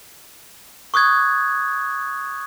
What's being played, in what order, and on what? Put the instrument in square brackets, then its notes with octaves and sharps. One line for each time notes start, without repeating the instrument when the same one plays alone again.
[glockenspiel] C#6 D#6 F#6 G#6 A6